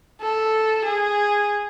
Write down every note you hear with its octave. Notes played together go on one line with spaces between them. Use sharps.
A4
G#4